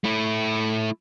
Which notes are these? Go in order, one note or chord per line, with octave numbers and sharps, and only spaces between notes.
A3 E4